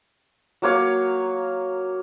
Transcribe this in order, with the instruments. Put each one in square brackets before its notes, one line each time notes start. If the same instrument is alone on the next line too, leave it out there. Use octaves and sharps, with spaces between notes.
[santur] F#3 A#3 C#5 F5